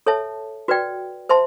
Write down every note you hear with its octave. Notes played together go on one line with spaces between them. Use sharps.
A4 C#5 E5 A5
F#4 B4 D5 G5
C5 E5 A5 C6